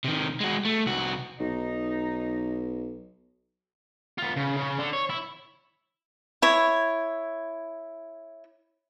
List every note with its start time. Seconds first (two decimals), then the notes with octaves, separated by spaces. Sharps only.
0.04 C3 D#3
0.40 G#3 F#4
0.65 A3
0.86 C2 F#4
1.41 B1 D#4
4.18 B3 F4
4.37 C#3
4.57 C#3
4.79 D3
4.93 C#5
5.10 E4
6.42 E4 C#5